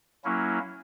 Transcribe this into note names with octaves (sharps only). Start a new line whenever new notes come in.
F#3 A#3 C#4 E4